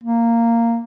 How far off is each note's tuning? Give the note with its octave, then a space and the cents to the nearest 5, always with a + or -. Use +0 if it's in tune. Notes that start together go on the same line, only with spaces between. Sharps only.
A#3 -10